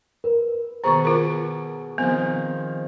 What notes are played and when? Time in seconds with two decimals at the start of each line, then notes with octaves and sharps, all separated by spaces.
0.24 A#4 B4
0.84 B2 D#3 G#4 C5 A#5 C#6
1.05 F4 A#4
1.98 D#3 F3 B3 C4 G6